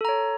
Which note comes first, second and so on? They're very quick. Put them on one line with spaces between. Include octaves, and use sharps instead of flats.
A4 A#5 C#5